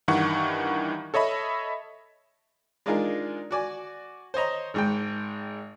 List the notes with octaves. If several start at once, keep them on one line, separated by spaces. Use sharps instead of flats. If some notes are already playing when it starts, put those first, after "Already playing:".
G2 D#3 E3 F#5 C#6
A4 C#5 D#5 E5 B5
G#3 D4 D#4 F4 G#4 A#4
F#4 D5 G#5
C5 C#5 D#5 A#5
G#1 G#2 G#3 G5